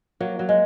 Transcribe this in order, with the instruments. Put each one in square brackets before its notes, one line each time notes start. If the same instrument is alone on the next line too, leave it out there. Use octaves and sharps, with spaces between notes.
[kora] F#3 A#3
F#3
G#3